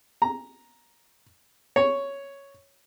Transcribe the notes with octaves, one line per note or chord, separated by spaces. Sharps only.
A#5
C#5